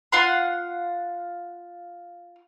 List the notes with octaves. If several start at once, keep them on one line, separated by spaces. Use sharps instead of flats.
F4 F5 F#5 C6